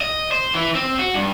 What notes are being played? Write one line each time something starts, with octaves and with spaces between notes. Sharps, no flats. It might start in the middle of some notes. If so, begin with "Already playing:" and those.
D#5
C5
E3
C4
F#4
G2